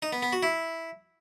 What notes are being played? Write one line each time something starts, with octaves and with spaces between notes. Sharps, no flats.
D#4
B3
B3
F#4
E4